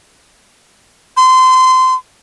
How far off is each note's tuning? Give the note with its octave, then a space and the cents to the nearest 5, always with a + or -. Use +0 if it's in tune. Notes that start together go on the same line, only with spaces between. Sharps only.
C6 -25